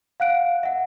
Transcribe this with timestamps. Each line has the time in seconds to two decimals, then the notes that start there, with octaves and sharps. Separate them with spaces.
0.20 F5 F#5 F#6 D7
0.63 E5 F#5